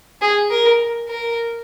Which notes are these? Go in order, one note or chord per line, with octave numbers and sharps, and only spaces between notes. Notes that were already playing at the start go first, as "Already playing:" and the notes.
G#4
A#4
A#4